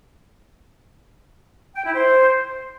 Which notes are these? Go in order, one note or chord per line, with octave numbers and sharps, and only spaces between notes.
G5
E4
C5